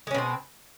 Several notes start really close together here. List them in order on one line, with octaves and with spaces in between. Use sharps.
G#3 C#4 B2 C4